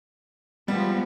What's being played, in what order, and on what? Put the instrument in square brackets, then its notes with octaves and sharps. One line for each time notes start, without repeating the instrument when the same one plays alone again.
[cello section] F3 G#3 B3 [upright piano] G3